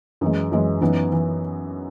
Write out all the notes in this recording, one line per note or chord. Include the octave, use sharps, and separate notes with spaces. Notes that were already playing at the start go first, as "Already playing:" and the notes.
F#2 E3 G#3
F#2 E3 G#3
F#2 E3 B3 D#4
E3